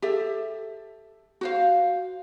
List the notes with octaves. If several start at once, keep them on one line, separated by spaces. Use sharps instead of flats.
G4 A4 E5
F#4 C5 F5